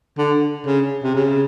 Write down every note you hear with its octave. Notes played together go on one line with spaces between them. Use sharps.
D3
C#3
C3
C#3